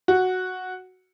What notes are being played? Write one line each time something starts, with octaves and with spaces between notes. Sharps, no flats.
F#4